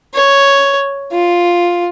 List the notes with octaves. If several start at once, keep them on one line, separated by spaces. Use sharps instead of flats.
C#5
F4